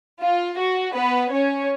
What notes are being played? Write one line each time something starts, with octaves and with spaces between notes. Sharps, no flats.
F4
F#4
B3 B4
C#4 C#5